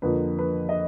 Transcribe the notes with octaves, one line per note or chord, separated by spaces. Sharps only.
F2 D3 F3 A#3 B4
B4
D#5